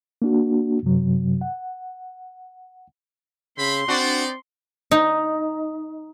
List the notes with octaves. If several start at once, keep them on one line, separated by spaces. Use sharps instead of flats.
A#3 D4 F#4
F#2 C3 F#3
F#5
C#3 C4 B5 C6
C4 D4 D#4 F#4 D5
D#4